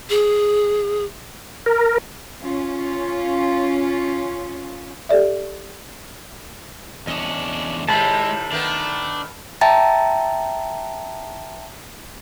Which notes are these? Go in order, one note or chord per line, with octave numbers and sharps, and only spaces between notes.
G#4
A#4
C#4 F4
G4 A4 D5 E5
E2 C#4 D4 D#5
A2 C3 D#3 G#3 A5 B5
D#3 A3 B3 D4
E5 G5 A5 A#5 A6